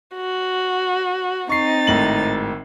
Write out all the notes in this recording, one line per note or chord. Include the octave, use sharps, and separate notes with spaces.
F#4
C4 D#4 C#6 A6 C7
G#1 A2 F#7